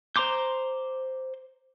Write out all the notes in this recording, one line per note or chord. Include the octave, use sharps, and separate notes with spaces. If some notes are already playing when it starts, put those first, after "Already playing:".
C5 A#5 C6 D6 G6